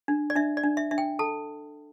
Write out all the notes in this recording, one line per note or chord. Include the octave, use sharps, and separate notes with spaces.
D4
D5
D4 E5
D5
D4
E5
D4 E5
G5
A4 A5